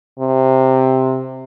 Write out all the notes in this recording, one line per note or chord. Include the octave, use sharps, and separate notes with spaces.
C3